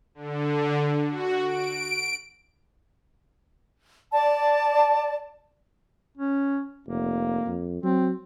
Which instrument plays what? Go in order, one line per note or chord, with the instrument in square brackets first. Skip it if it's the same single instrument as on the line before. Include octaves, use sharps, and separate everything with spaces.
[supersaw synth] D3
F#4
D7
[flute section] D5 A5
[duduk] C#4
[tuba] F1 [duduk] A#3
[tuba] F2
[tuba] F#3 [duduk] C4